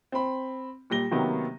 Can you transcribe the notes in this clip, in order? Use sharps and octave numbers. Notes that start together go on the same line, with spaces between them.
C4 B5
A#2 G3 A#6 G7
C3 D#3 F#3 A#3 B3 G4